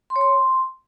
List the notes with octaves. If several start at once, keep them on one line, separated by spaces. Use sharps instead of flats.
C6
C#5
C6